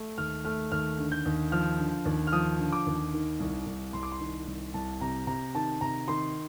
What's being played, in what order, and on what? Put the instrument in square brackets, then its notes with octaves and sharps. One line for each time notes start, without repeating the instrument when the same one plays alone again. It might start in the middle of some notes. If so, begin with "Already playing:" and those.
Already playing: [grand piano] A3
D#2 F6
A3 F6
D#2 F6
D3
G6
D#2
F3 F6
D3
D#2
F6
F3 D#6
D3
D6
D#2
D#3
C2
C2
C2 C6
D6
C6
D#3
C2
C2 A5
C3 A#5
C3 A#5
D#3 A5
C3 A#5
D#3 C6